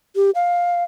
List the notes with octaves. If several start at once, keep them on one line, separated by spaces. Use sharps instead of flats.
G4
F5